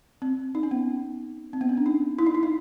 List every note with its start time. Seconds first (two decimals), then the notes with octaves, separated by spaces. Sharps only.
0.22 C4
0.55 D#4
0.63 C#4
0.71 B3
1.53 C4
1.61 B3
1.69 C#4
1.77 D4
1.86 D#4
2.19 E4
2.26 D#4
2.35 E4
2.43 D#4